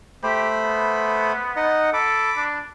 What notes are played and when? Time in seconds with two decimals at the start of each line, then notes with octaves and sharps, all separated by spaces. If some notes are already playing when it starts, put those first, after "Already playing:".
0.23 A3 G4 C5 B5
0.60 B3
1.56 D#4 D#5 F#5
1.93 A4 B5 D6
2.37 D4